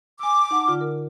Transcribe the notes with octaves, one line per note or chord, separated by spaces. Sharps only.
G#5 D6 E6
D#4 F#5 A5
D3 F4 F6
A#4